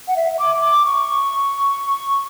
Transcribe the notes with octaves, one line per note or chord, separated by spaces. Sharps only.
F#5
E5
D6
D6
C#6